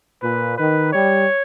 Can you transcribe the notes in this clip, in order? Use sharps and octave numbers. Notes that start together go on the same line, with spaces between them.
A#2 B4
D#3 B4
G3 C#5